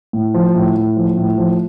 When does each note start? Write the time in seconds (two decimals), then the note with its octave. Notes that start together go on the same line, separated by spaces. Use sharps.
0.13 A2
0.34 F3
0.55 A2
0.76 A2
0.97 F3
1.18 A2
1.38 F3